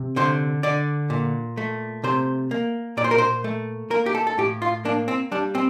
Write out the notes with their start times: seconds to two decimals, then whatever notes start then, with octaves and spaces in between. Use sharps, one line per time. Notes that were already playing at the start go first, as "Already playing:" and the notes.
Already playing: C3
0.16 D3 C5
0.63 D3 D5
1.10 A#2
1.57 A3
2.04 C3 C5
2.51 A#3
2.97 A#2 D5
3.04 C5
3.11 A#4
3.18 C5
3.44 A3
3.90 A#3 A#4
4.06 G4
4.15 A4
4.27 A4
4.38 A2 G4
4.62 F4
4.85 A#3 D4
5.08 C4
5.31 G3 D4
5.55 C4